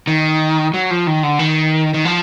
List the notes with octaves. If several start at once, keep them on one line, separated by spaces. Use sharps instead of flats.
D#3
F#3
F3
D#3
D3
D#3
D#3
F3